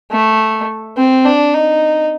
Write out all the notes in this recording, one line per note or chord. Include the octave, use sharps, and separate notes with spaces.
A3
C4
D4
D#4